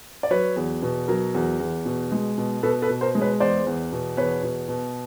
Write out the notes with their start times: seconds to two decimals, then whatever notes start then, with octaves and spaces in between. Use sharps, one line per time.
0.23 D5
0.31 F#3 B4 C#5
0.56 E2
0.82 B2
1.08 F#3 A#4
1.34 E2
1.60 E2
1.86 B2
2.12 G#3
2.38 B2
2.63 B2 A4 B4
2.82 A4 B4
2.89 B2
3.01 A#4 C5
3.15 G#3
3.21 B4 C#5
3.40 E2 C5 D5
3.67 E2
3.92 B2
4.17 E2 B4 C#5
4.43 B2
4.68 B2